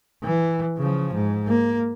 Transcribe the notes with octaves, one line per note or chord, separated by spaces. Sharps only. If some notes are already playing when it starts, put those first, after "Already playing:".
E3
C#3 F3
G#2
A#3